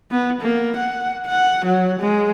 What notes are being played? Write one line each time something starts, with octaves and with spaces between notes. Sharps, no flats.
B3
A#3
F#5
F#5
F#3
G#3